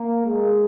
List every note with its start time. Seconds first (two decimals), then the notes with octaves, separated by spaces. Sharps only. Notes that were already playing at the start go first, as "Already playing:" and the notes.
Already playing: A#3
0.26 G#3